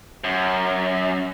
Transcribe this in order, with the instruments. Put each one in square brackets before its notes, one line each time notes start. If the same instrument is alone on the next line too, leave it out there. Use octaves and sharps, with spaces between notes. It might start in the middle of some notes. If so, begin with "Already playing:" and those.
[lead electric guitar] F#2